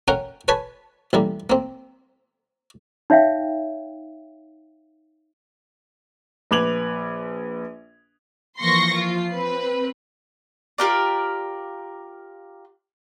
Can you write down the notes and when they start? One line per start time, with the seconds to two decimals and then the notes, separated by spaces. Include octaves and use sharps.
0.08 C#4 A#4 F#5 G5
0.48 B4 C#5 G#5 A5 B5
1.13 A1 G3 A#3
1.50 A#3 C4
3.10 D#4 C#5 E5 F5 G5
6.51 A#1 B4 D6 G#6 F7 F#7
8.59 E3 F3 A#3 C6 C#6 A#6
8.94 F3 F4 C7
9.32 C4 B4
10.78 F4 G4 A#4 D5